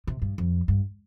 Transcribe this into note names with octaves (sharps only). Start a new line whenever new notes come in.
C3
G2
F2
G2